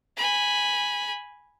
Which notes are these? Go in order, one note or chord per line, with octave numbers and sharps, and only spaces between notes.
G#5 B5